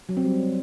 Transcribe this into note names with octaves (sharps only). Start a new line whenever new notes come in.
F#3
C4
G3